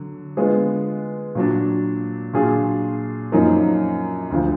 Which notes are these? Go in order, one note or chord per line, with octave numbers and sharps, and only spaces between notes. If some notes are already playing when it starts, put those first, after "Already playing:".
Already playing: D3 F#3
D3 G#3 B3 F4 G#4
A#2 F#3 D4
A#2 F#3 D4 F4 G#4
F#2 F3 A#3 D#4
D2 D3 F3